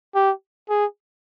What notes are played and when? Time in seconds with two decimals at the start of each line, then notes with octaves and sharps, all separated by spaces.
0.15 G4
0.69 G#4